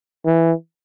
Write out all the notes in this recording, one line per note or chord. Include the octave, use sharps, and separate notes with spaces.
E3